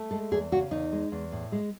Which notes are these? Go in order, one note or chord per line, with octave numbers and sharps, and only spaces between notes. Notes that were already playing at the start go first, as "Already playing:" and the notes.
Already playing: A3
G#3 A4
E2 G#4
C#3 F#4
E2 D#4
G#3
E2
A2
G#3